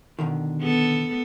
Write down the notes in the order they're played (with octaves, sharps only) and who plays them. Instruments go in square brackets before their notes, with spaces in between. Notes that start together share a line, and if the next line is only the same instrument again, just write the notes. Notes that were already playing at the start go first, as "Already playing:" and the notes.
[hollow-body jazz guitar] B2 D3 D#3
[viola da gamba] B3 A4